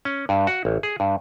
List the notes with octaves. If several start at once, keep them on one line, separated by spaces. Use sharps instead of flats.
C#4
G2
F#4
A1
G#4
G2